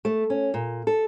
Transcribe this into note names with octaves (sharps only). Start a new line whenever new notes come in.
A3
C#4
A#2
A4